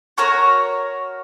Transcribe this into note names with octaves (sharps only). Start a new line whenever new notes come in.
F#4 A#4 C#5